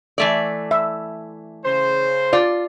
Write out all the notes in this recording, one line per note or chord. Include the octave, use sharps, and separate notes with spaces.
E3 A3 D5
E5
C#3 C5
F4 D5